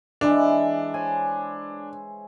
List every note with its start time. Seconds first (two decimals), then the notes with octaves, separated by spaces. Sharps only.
0.21 E3 G#3 D4 E4
0.94 C5 C#5 G#5